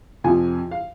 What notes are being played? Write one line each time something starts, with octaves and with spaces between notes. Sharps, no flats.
F2 C3 F3 G#5
F5